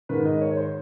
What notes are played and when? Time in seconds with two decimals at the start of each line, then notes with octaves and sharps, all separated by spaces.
0.09 G#2 D#3 B4
0.25 D#5
0.41 C#5
0.51 C#5
0.57 C5